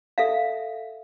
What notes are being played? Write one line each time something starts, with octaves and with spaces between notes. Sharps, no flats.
A4 E5 F5